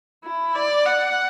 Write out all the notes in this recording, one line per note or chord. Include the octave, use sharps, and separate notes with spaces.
E4
D5
F#5